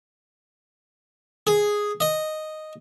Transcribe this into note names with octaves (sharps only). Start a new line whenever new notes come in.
G#4
D#5